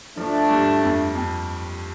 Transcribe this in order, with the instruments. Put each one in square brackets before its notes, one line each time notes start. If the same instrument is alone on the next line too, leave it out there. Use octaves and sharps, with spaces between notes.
[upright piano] F3 [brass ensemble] A3 D4
[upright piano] G2
F2
F2